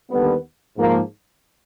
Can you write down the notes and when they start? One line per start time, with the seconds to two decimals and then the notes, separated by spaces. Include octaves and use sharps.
0.11 D#2 D3 G3 B3
0.76 G#2 F3 A#3